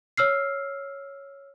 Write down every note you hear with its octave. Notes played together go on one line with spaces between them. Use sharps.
C#5 E6 F6 C7